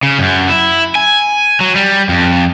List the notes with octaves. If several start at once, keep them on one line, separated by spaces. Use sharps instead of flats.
C#3
F#2
E4
G#5
F#3
G3
F2